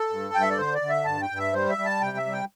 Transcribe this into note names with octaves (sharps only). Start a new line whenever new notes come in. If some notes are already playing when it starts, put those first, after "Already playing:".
Already playing: A4
G2
G2 G5
E5
D5
D3 C5
D5
D3
E5
G2 A5
G5
G2
E5
G3 C5
E5
G3
A5
C3 G5
E5
G3
G5